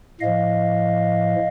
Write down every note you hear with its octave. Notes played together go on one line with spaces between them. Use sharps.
A2 F3 D#5 F5